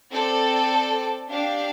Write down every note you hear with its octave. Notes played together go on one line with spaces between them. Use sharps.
C4 A4 D5
D4 G4 F5